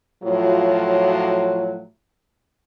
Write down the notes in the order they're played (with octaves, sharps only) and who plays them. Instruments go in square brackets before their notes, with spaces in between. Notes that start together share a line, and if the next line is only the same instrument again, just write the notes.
[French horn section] A2 F3 F#3 F4 F#4